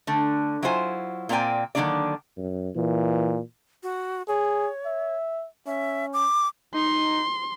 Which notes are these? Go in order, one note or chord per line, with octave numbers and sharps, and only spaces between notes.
D3 A3
F#3 E4 F4 C5 G#5
A#2 A#3 C4 D5 G5 G#5
D3 D#3 F#3 A#3 D4 D5
F#2
A#2 E3
F#4
G#4 C#5
E5
C#4 E5
D6
D#4 C6